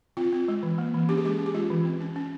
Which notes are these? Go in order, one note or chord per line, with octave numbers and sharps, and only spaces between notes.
C4 F4
C4
G#3
E3
A#3
E3
C#4 G4
G#4
G#3 G4
C#4
G4
G#3 F4
E3
C4
C#4
C#4